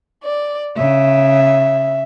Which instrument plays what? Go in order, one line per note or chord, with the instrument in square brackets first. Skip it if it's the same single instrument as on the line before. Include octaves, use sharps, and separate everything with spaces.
[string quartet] D5
[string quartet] C#3 [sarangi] E5